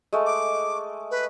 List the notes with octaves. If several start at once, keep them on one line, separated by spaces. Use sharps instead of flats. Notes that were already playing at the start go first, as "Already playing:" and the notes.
G#3 A3
D6
B4